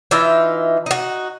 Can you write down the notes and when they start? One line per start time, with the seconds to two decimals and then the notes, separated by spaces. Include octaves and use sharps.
0.11 E3 D#4 F4 E5
0.86 D#4 F#4